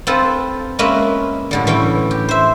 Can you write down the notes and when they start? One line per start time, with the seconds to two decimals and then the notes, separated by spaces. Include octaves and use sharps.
0.07 C4 F4 A4 B4
0.79 G#3 A#3 C#4 B4 D#5 E5
1.51 A2 D3 G3
1.67 E3 C#4 E4 G5
2.11 G4
2.29 C5 E5